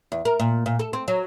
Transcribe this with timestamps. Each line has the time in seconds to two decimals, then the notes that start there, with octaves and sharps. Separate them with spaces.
0.12 E2
0.25 A#4
0.40 A#2
0.66 A#2
0.79 A4
0.93 C4
1.08 F#3